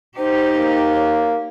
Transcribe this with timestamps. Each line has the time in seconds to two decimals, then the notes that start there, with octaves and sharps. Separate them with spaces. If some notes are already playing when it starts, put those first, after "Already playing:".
0.18 D#4 G4 C5
0.56 A#3
0.94 C#5